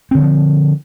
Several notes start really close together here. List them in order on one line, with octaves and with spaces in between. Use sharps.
C4 D3 E3 F3